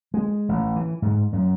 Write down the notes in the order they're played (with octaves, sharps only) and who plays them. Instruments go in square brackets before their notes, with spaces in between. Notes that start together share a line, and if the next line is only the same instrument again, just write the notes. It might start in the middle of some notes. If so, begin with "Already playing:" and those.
[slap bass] G#3
A1
E3
G#2
F#2